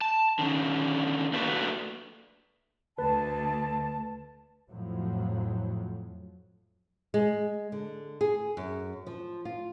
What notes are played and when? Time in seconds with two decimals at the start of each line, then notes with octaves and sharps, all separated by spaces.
0.01 A5
0.39 D3 D#3 C#4
1.33 A3 A#3 D4 F#4 B4 E5
2.99 D2 B4 A5
4.71 F2 A2 F3 F#3
7.14 G#3
7.72 D3
8.21 G#4
8.57 F#2
9.07 F3
9.45 F4